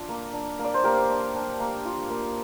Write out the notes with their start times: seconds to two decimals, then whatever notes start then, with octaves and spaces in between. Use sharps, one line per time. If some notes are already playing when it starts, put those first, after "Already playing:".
Already playing: D4 F4
0.09 A#3
0.33 D4
0.59 A#3
0.64 D5
0.74 C5
0.84 A#3 G4 A#4
1.10 D4
1.34 D4
1.60 A#3
1.85 F4
2.10 A#3